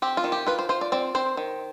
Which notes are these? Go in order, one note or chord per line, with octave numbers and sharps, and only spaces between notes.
C4 G4
F4
D#3
G4
F4 B4
C5
F4 C5
D5
C4 D5
C4 C5
D#3